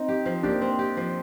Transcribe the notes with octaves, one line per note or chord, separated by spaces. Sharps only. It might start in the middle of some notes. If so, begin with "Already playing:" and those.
Already playing: C4 D#4
G4
F3
A#3 D4 G4
C4
G4
F3